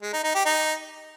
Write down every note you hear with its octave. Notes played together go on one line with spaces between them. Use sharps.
G#3
D#4
D#4
G4
D#4